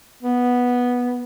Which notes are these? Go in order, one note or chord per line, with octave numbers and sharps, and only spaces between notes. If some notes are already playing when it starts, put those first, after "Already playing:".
B3